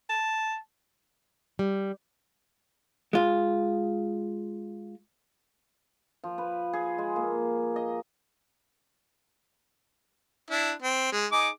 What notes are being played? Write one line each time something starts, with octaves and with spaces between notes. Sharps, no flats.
A5
G3
G#3 F4
F3
B4
G#4
G#3
A#3
D#5
D4 E4
C4
G#3
D#4 G#4 D6